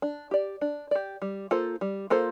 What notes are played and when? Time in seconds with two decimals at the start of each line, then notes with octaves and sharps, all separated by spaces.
0.02 D4
0.31 G4 D5
0.61 D4
0.91 G4 D5
1.22 G3
1.51 A#3 F4 A4 C5
1.81 G3
2.10 A#3 F4 A4 C5